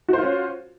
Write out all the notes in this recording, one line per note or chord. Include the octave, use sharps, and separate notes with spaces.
C#4 F4 F#4 C5